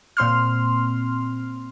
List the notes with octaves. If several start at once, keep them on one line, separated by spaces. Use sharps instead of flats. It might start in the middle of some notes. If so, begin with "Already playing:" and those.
A#2 C4 C6 F6